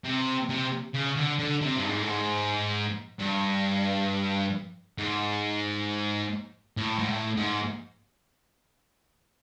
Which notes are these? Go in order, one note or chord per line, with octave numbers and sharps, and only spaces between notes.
C3
C3
C#3
D3
D3
C3
G2
G#2
A2
G#2
G2
G#2
A2
G#2
A2
G#2